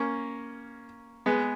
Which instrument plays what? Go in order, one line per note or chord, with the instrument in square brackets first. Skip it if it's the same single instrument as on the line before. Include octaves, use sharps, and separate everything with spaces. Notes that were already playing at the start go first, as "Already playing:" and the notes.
Already playing: [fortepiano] A#3 C#4
G#3 B3